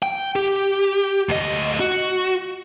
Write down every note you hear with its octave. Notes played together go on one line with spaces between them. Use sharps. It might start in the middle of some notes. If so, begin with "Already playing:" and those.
G5
G4
D2 D#5
F#4